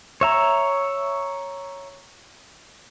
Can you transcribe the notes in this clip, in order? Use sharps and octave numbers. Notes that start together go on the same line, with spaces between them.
C#5 E5 A#5